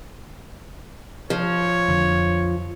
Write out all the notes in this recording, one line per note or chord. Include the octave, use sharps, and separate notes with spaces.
F3 C#5
F2 D3